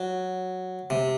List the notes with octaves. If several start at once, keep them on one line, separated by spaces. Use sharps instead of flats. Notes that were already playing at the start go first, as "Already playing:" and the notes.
Already playing: F#3
C3